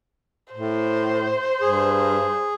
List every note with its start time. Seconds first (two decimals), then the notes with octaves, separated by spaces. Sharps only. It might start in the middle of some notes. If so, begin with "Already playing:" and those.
0.53 A2 C5
1.62 G2 G#4